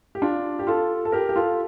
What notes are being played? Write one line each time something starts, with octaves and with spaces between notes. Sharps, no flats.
G4
D4 F4
G4
F4 A4
A4
G4 A#4
G4
F4 A4